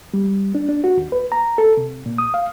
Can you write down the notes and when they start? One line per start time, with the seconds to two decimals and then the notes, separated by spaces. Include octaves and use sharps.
0.14 G3
0.55 D4
0.69 D4
0.84 F#4
0.97 D#2
1.12 B4
1.32 A#5
1.58 A4
1.77 C3
2.06 A#2
2.18 D#6
2.34 F5